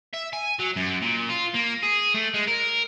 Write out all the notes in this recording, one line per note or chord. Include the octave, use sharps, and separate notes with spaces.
E5
G#5
F#3
F#2
A#2
F4
A#3
G#4
A3
G#3
A#4